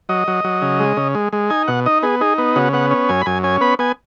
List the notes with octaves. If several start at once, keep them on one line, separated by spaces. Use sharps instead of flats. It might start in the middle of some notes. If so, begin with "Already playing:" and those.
F#3 D#5
F#3
F#3
C#3
G#3
C#3
G#3
G#3
D#4 G#5
B2 F#5
D#4 D#5
B3 G#4
D#4 G#4
B3
C#3 F#4
B3 F#5
C#4
F#2 G#5
B5
F#2 G#5
C#4 G#5
B3 B5
B3 G#5